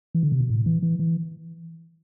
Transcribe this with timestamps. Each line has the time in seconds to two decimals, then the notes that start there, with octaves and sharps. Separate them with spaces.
0.15 E3
0.23 D3
0.32 C3
0.41 B2
0.50 A2
0.66 E3
0.82 E3
0.99 E3